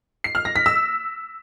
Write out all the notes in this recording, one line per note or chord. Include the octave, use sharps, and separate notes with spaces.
C7
F6
A#6
B6
E6